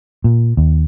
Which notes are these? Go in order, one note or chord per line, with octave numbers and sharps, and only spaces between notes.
A#2
D#2